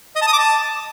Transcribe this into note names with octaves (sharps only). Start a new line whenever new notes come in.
D#5
A5
D#6
D6
A5